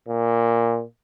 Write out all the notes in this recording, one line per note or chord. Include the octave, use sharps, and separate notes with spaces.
A#2